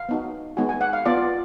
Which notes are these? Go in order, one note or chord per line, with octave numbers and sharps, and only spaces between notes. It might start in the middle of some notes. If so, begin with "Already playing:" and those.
Already playing: F5
B3 D#4 F#4
G#3 B3 D#4 F#4 G#5
G#5
F#5
F5
B3 F4 D5